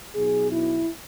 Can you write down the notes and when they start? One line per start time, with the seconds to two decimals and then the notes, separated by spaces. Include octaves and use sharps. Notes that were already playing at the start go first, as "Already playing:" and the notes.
0.15 B1 B2 G#4
0.51 E4